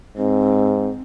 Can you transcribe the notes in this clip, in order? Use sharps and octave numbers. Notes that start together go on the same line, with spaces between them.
G#2 C4